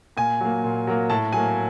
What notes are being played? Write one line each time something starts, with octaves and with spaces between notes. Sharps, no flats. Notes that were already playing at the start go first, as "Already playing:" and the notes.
A#2 G#5
F#3 A#3
A#2
F#3 A#3
A2 A5
F#3 A#3 G#5